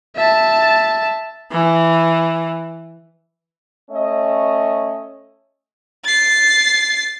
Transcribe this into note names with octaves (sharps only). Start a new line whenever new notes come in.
E5 A5
E3
A3 C#4 D#5
A6 C7